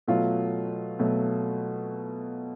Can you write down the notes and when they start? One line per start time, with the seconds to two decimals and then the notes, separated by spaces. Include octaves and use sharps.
0.08 B2 F#3 A3 F4
0.99 B2 F#3 A3